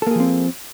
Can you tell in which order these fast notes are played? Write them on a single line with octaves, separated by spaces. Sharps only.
A4 A#3 G#4 F3 C4